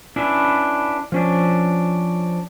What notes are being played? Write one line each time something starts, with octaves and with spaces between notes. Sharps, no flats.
C#4 D4 E4 B4
F3 C#4 D4